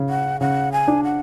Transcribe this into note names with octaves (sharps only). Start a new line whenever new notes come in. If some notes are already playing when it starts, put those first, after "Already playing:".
Already playing: C#3
F#5
C#3 F#5
G#5
D4
F#5